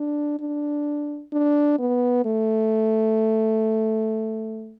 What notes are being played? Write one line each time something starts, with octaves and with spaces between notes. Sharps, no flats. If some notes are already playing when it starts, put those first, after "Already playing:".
Already playing: D4
D4
D4
B3
A3